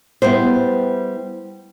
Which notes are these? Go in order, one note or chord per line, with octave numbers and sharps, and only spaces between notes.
G3 B3 E4 C5